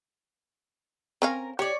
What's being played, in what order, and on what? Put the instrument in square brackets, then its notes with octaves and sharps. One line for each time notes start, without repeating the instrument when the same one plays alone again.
[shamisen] C4 C#4 F5 [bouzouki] A#4
[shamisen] G4 [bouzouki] C#5 D5